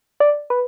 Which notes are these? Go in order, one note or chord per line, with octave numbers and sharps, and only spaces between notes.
D5
B4